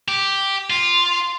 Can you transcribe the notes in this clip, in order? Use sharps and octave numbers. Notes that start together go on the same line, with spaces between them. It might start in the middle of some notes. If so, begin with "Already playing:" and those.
G4
F4